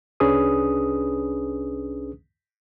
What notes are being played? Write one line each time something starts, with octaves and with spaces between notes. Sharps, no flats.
C2 C#4 D4 G#4 B4 D#6